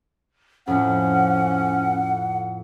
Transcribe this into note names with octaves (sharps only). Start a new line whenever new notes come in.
F2 A2 C#4 F#5